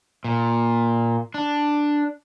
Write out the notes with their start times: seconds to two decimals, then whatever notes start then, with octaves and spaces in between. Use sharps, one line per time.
0.24 A#2
1.34 D4